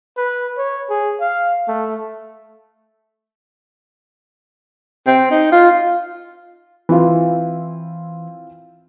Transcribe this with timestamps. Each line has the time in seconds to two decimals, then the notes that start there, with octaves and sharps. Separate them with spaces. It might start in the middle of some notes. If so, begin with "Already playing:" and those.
0.17 B4
0.58 C#5
0.90 G#4
1.21 F5
1.68 A3
5.07 C4
5.31 D#4
5.52 F4
6.89 E3 C4 E4 F4